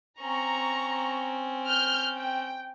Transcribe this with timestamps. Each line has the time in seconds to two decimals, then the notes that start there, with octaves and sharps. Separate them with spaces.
0.21 C4 C#4 A#5 C#6
1.68 F6 G6
2.15 G5